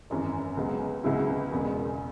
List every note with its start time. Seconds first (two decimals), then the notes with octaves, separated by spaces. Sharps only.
0.10 G#1 F#2 E3 C#4
0.57 C#2 C#3 F#3 B3
1.04 C#2 C#3 F#3 B3 E4
1.52 E1 E2 C#3 G#3